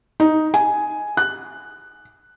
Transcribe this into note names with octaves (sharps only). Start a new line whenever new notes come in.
D#4
G#5
F#6